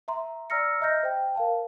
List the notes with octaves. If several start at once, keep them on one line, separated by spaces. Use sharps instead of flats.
E5 A#5 C6
D5 A#5 E6 F6 A#6 C#7
D#5 E5 A#5 F6 G6 A#6
C5 G5
A#4 F5 A5